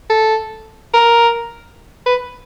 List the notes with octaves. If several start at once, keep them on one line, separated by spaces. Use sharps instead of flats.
A4
A#4
B4